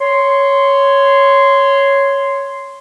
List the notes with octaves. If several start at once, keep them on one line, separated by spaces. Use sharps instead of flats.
C#5 C6